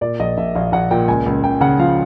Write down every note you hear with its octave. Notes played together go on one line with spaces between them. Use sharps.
A#2 D5
A#1 D#5
A#1 E5
A#1 F5
A#1 F#5
A#2 G5
C#2 G#5
C#2
C#2 G5
C#3 F#5
F3 F5